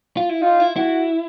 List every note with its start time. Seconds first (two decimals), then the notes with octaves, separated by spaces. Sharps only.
0.17 F4
0.29 E4
0.41 D#4 F4
0.60 E4
0.76 E4 F#4